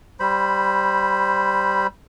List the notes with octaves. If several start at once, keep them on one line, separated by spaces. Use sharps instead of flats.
G3 C5 B5